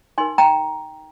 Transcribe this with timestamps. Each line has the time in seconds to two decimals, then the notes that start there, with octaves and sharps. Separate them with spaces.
0.18 D#4 A#4 G#5 C6
0.38 G5 A#5